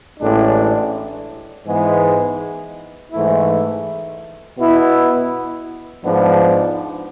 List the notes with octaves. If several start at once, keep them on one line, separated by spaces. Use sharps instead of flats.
A1 A2 G#3 D4
G#2 E3 G#3 B3
G#2 E3 A3 E4
B2 B3 E4
G#2 F3 B3 D4